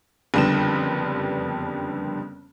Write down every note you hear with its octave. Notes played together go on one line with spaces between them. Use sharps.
F#1 F2 D3 G3 B3 E7